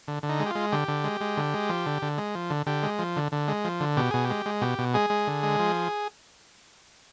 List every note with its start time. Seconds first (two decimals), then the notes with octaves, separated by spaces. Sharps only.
0.08 D3
0.23 D3
0.29 D#4
0.40 G#3
0.46 G4
0.51 G#3 F4
0.72 D3 G4
0.88 D3
1.04 G#3
1.21 G#3
1.37 D3
1.54 G#3
1.69 F3
1.86 D3
2.02 D3
2.18 G#3
2.35 F3
2.50 D3
2.66 D3 G4
2.83 G#3
2.99 F3
3.16 D3
3.32 D3
3.48 G#3
3.64 F3
3.80 D3
3.97 B2 G4
4.11 B2 G#4
4.24 G4
4.30 G#3
4.46 G#3
4.61 B2 G4
4.78 B2
4.94 G#3 G#4
5.10 G#3
5.27 D3
5.43 G#3
5.59 F3